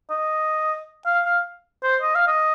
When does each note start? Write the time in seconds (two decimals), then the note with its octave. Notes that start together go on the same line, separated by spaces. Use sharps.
0.10 D#5
1.06 F5
1.25 F5
1.83 C5
2.02 D#5
2.15 F5
2.27 D#5